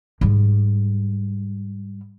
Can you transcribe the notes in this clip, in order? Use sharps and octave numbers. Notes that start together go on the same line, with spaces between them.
G#2 G3